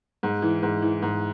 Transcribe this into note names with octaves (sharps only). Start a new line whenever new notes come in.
G#2
E3
G#2
E3
G#2